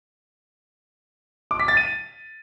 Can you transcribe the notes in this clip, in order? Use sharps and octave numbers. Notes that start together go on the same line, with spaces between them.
D6
B6
A6
D#7